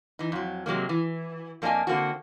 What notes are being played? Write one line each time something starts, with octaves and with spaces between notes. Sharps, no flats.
E3 D#4
F2 F#3
C3 F#3 G#3 A#3
E3
F2 A#3 D4 F#4 D#5 G#5
D3 A#3 C4 F#4